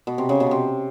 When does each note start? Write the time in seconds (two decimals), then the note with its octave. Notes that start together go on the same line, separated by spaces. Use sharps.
0.07 B2
0.18 C3
0.29 C#3
0.40 B2
0.51 C3